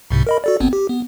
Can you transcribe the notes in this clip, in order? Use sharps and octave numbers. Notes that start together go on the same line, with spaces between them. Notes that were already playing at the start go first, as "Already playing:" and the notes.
C2 G#2 C3
A#4 D#5 B5
F#4 A4 D5
G#1 B3 C4
G4
B3